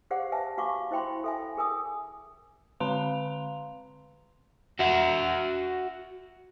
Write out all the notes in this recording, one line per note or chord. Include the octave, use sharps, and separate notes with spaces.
G4 G#4 C5 D5 F5 F#5
B4 C5 E5 G#5 A5
F#4 F5 C#6 D6
E4 C5 E5 G5 B5 C6
A4 E5 G#5
G#4 A#4 G#5 D#6
D3 C4 F5 A#5 C6 F7
F#4 E5